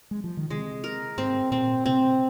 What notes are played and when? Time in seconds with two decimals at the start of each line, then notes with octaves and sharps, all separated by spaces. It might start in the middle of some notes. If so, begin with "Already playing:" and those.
0.11 G#3
0.24 F3
0.37 D#3
0.50 C3 G#3
0.84 A#4
1.18 G#2 C4
1.51 A#2 C4
1.86 C3 C4